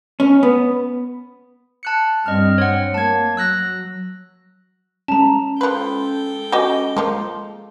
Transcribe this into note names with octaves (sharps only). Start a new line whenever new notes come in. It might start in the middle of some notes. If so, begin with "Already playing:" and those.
C#4
B3
A5 F#6 C#7
G2 G3 C4 D#5 F6
C#5 F#5
A#3 A5 G#6
F#3 E6 F#6 A#6
G#3 C#4 A5 A#5
F3 A4 B4 G5
F#4 G4 D#5 G#5 D6 G7
F3 G#3 A#3